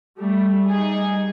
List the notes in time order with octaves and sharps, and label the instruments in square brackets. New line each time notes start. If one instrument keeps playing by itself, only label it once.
[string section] G3 A3
G3 D#4 G#4